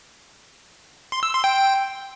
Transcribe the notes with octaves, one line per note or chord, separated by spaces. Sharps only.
C6
E6
C6
G5